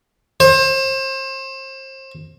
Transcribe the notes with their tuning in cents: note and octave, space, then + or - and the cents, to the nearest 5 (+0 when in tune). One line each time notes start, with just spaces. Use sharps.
C5 +30